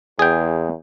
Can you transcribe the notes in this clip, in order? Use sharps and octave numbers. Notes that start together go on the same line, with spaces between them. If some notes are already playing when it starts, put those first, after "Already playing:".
E2 G#4 G5